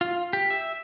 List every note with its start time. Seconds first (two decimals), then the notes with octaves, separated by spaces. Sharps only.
0.01 F4
0.33 G4
0.50 E5